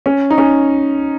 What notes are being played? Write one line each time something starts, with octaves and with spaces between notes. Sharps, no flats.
C#4
D#4
C#4